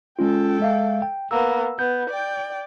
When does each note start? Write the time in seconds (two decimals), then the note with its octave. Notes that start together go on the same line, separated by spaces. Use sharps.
0.19 G#3 C#4 F4 A4 G5
0.60 G#3 E5 F5
1.02 G5
1.31 A#3 B3 E6
1.79 B3 G6
2.10 D5 G5